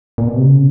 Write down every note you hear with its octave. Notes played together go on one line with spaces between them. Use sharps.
A#2
B2
C3
C#3